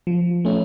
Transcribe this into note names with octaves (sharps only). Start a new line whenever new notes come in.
F3
A3 C#4